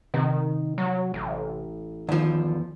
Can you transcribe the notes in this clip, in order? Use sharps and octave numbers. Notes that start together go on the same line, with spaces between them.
C3 D#3
F#3
A1
E2 D#3 F3